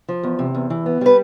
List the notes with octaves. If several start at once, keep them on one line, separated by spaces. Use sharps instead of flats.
F3
E2
C3
E2
E3
B3
G3 B4